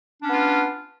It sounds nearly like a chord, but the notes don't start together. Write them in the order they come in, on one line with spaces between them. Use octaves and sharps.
D4 C#4 B3 F4